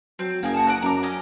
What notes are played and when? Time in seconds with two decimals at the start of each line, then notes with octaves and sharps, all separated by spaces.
0.19 F#3 C4
0.43 F#1 A#3 G#5 D#6
0.54 F#4 A5
0.67 D#5 F#5 D6
0.82 F#2 A#5 D6
1.03 C#4 D#5